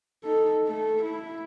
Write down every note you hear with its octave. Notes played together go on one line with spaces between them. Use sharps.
D#4 A4
A3 A4
E4